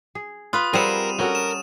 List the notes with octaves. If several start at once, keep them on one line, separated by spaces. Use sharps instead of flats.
G#4
F4 B4 D#6
G3 C4 F4 G#4 A#4 F#5 D#7 E7
C#4 F#4 A4 A#4
E7